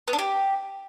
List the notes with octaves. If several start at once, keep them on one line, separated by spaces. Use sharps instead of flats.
B3
D4
G4